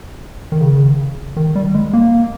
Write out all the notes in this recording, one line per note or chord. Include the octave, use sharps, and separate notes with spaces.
D#3
C#3
D#3
G3
G#3
A#3